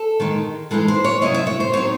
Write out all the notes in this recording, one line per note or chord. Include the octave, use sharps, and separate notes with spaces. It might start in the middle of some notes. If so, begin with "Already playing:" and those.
Already playing: A4
D#3 G#3 D#4
E3 G#3 D#4 A4
C5
C#5
C3 F#3 C#4 E4 D#5
E5
C#5
C5
F#3 C4 D#4 C#5